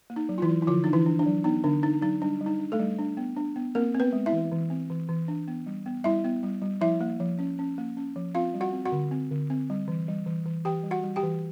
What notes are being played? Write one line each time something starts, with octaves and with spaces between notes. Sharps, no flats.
A#3
D#4
F#3
F4
E3 E4
F#3
E4
D3 F3 F4
D4 D#4
E3 E4
D4
D4
F#3
B3 D#4
D3 D4
D4 D#4
F#3 D#4
G3 D4
G3
D#4
D4
A3 A4
G3
D4
B3
D4
B3
A#3 C4 A#4
C4
B3 B4
G#3
E4 E5
E3
E3
C4
E3
E3
D4
B3
G3
B3
G3 E4 E5
B3
G3
G3
F3 E4 E5
A#3
F3
C#4
C#4
A#3
C#4
F3
C4 F4 F5
G3
F#4 F#5
C4
F#4 F#5
D3
C4
D3
C4
G3
E3
G3
E3
E3
E3 G4 G5
G3
F#4 F#5
G3
G4 G5
E3